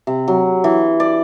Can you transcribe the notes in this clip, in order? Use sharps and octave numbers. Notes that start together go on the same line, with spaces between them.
C3
F#3
E3
D5